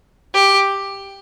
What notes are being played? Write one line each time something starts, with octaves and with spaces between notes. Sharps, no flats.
G4